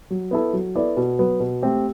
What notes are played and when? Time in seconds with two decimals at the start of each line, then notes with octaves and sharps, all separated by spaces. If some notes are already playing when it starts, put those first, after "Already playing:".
0.11 F#3
0.31 B3 E4 A4
0.53 F#3
0.75 B3 E4 A4 D5
0.97 B2
1.19 F#3 B3
1.40 B2
1.62 A3 C4 G4